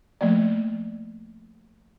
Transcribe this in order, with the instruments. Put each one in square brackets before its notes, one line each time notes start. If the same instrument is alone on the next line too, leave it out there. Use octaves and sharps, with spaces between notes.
[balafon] F3 A3 A#3 D5